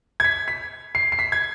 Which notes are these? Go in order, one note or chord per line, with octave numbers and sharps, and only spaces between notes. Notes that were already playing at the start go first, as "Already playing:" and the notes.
G#6
B6
B6
C7
C7
B6
G#6